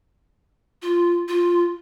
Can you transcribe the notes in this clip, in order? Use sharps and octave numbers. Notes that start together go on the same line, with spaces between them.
F4
F4